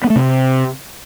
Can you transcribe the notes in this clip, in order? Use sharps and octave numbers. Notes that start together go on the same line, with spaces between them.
B3
A3
C3